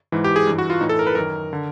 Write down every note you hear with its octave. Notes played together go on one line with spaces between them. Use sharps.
G#2 E3
G4
G#4
G2 E3
F#4
F4
A2 E3 D#4
A4
A#4
B4
F#2 D#3 A#4
D3